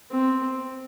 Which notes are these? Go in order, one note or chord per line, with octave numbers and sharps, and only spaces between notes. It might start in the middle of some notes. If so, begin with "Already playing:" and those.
C4